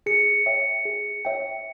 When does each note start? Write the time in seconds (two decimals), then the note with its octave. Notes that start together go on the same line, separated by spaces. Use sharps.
0.06 G#4 C#7
0.46 C#5 E5 G5
0.85 G#4
1.25 C#5 E5 G5